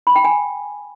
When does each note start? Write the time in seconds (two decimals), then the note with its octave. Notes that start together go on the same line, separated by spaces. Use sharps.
0.07 B5
0.16 G5
0.24 G#5